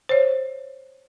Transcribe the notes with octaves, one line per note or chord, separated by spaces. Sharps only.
C5 C#5